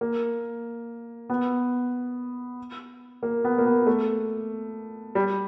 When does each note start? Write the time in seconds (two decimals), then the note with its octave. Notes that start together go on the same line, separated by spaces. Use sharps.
0.01 A#3
1.30 B3
3.23 A#3
3.44 B3
3.58 A#3
3.65 B3
3.87 A3
5.15 G3